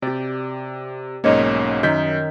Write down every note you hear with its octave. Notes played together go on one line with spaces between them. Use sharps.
C3 G4 D5
B1 G#2 A#3 C#4 C#5 D#5
F#2 D#3 G6 B6